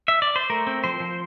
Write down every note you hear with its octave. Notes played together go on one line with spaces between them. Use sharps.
E5
D5
C5
A3 A#4
C4
F3 C5
F3